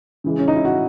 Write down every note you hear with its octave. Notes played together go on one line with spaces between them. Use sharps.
C#3 E3 G#3
C#4
D#4
E4
F#4